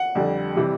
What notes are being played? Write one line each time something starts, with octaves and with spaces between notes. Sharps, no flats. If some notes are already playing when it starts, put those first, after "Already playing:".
Already playing: F#5
F2 D3 G3
C3 E3 G3